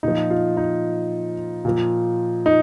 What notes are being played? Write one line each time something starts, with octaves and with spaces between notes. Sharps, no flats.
A#2 F3 D#4
F4
D#4
A#2 F3
D#4